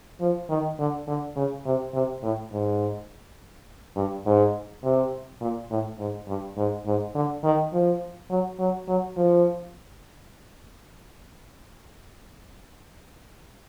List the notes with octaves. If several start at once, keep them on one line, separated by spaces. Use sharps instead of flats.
F3
D#3
D3
D3
C#3
C3
C3
A2
G#2
G2
G#2
C3
A#2
A2
G#2
G2
G#2
G#2
D3
D#3
F3
F#3
F#3
F#3
F3